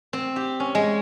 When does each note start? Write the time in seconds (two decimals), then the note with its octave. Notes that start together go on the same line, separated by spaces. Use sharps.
0.13 C4
0.36 G4
0.60 C#4
0.75 G#3